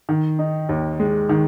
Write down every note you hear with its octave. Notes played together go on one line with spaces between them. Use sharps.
D#3
D#4
D#2
G#3
D#3